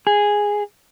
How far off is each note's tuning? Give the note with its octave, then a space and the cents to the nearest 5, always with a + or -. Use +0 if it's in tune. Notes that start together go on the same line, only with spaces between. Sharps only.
G#4 -10